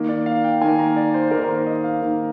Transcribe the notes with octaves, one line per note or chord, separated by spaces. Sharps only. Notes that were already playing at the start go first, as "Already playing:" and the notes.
Already playing: D#3 A#3
D5
F5
G5
D#3 A#3 G#5
A#5
D5
C5
D#3 A#3 A#4
A#4
C5
D#5
F5
D#3 A#3